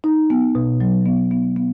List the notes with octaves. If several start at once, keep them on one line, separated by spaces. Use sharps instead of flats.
D#4
B3
B2
F#3
B3
B3
B3